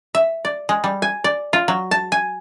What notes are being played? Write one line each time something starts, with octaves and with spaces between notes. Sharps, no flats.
E5
D5
G#3
G3
G#5
D5
F4
F#3
A5
G#5